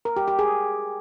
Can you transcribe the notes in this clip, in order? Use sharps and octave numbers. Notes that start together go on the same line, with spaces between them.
A#4
G4
G4
G#4